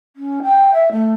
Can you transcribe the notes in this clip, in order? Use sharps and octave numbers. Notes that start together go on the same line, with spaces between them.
C#4
G5
E5
A3